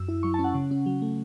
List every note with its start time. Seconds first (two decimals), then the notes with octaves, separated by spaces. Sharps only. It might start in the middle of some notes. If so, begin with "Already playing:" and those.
Already playing: F#2 E6
0.08 E4
0.23 F#3 C#6
0.34 A5
0.39 C#4
0.44 F#5
0.54 C#3
0.71 C#4
0.86 F#3
1.02 A3